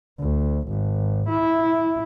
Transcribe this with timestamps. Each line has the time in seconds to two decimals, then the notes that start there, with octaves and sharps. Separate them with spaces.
0.20 D2
0.69 G#1
1.29 E4